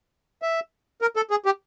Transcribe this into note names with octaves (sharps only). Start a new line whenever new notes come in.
E5
A#4
A4
G#4
G4